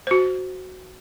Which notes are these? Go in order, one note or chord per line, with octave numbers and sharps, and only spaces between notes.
F#4 C5